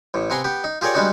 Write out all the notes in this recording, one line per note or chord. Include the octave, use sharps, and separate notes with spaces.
A1 A2
C3 B3 G#5 A#5 C6
B3 G4
D#4
F4 G4 G#4 A#4 C#5 D5
G3 G#3 B3 D4 D#4 F#4